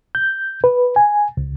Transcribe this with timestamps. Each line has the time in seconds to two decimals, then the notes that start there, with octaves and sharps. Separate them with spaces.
0.15 G6
0.64 B4
0.96 G#5
1.37 C#2